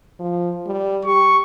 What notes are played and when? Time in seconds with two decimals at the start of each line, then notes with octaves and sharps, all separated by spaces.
0.19 F3
0.66 G3
1.05 G4 C#6